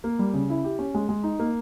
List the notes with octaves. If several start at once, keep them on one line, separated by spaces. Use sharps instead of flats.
A#3
G3
C#3
E4
G4
C#4
G#3
G#3
D#4
A#3